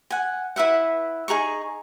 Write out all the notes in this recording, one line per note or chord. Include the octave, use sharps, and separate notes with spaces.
F#5 G#5
E4 B4 E5 F#5
D#4 G#4 A#5 C#6